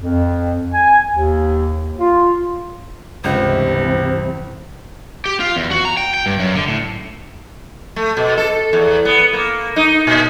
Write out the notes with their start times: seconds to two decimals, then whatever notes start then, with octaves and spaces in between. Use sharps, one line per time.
0.01 F2
0.73 G#5
1.12 D#2
2.00 F4
3.24 C#2 G2 C3 E3 C5
5.26 G4
5.40 F4
5.56 E2
5.71 F#4
5.85 A#5
5.97 G5
6.14 G5
6.26 G2
6.39 F#2
6.55 D3
6.68 A2
7.96 A3
8.17 B2
8.37 A4
8.73 E2
9.05 B3
9.33 A#3
9.76 D#4
10.07 A#2